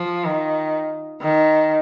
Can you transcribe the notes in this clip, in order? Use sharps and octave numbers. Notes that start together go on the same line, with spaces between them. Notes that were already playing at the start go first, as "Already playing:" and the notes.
Already playing: F3
D#3
D#3